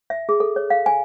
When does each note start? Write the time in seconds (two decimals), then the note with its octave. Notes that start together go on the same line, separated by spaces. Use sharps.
0.10 E5
0.29 G#4
0.40 A4
0.56 C#5
0.70 F5
0.86 G#5